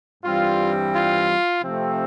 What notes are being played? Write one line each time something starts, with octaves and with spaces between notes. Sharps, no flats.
G2 E3 G3 C4 F4
F4
C3 F3 A3 C4